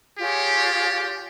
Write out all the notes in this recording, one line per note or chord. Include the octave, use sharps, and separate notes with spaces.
F4 G4 G#4 C#5